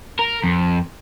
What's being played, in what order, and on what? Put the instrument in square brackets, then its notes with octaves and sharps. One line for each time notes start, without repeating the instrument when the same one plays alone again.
[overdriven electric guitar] A#4
F2